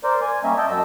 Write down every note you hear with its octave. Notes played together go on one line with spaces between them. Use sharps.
A#4 C5 D5
G#5
G3 A#3 C#4 D#5 E5
D#5 E5 G5 A5
F#2 F#3 D#5 E6